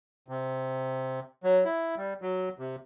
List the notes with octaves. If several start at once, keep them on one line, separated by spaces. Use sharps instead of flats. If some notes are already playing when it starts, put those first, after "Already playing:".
C3
F#3
E4
G3
F#3
C3